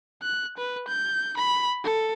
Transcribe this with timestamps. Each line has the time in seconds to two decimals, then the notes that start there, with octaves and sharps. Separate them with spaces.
0.22 F#6
0.58 B4
0.88 G6
1.37 B5
1.84 A4